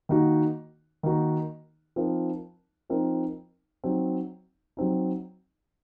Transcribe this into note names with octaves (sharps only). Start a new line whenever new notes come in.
D#3 A#3 D#4 F#4
D#3 A#3 D#4 F#4
F3 C4 D#4 A#4
F3 C4 D#4 A#4
F#3 C4 D#4
F#3 C4 D#4